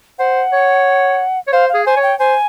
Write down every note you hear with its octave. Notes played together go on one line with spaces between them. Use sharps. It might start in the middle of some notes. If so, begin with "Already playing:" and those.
C5 F#5
C#5
C#5
C5 F5
F5
G#4
C5 G#5
C#5
G5
C5 G#5